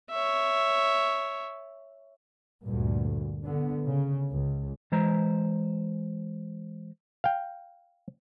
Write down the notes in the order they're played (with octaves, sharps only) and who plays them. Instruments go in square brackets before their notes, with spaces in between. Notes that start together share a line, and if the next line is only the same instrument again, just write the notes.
[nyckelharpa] C#5 E5
[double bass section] D2 G2 A#2
D3 B3
C#3
C#2
[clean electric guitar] E3 G#3 C5 A#5
[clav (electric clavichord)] F5 G5